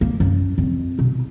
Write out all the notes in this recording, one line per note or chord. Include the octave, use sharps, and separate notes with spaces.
A#3
F#2
F2
B2